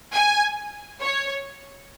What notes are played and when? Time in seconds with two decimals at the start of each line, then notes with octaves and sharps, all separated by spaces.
0.14 G#5
1.01 C#5